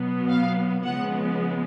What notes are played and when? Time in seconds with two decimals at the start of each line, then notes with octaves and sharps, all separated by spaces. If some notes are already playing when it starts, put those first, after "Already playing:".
Already playing: B2 F#3 B3
0.30 F5
0.84 C#3 F3 G#3 B3 F#5